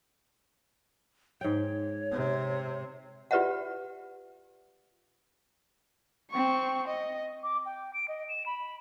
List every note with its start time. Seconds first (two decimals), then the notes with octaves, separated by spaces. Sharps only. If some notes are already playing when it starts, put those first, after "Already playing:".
1.41 G#2 C#5 G5
2.12 C3
3.31 F4 G4 B4 D5 E5 F#5
6.31 C4 C#6
6.88 D#5
7.43 D6
7.66 G5
7.94 D7
8.08 D#5
8.29 E7
8.46 B5